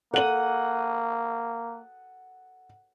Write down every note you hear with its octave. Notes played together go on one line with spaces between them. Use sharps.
A#3 A4 F#5 D#6 F#7